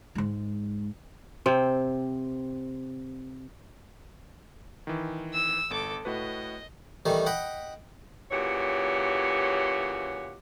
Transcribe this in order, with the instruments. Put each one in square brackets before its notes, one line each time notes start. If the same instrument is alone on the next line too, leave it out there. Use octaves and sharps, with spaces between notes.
[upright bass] G#2 G#3
[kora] C3 C4
[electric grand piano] D#3 E3
[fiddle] E6
[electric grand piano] G1 [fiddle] A4 D6
[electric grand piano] A2 F#4 B4 [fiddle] D#5
[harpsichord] D#3 E3 G3 A3 D#4
D#5 F#5 G5 B5
[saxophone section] A#2 C#3 E3 F#4 G4 C#5